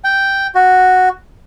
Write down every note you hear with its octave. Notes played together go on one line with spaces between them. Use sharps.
G5
F#4